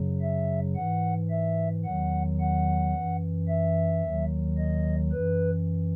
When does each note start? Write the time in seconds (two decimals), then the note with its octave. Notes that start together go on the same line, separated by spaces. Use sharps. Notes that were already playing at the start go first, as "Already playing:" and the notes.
Already playing: F#2 C#3 F#3
0.21 E5
0.76 G#2 E3 F#5
1.30 E5
1.85 E2 D#3 F#3 F#5
2.40 F#5
2.94 F#2 E3
3.48 E5
4.03 D#2 D#3 F#3
4.58 D#5
5.12 F#2 E3 B4